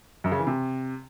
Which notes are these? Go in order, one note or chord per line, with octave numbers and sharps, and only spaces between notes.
F#2
C#3
E3
C3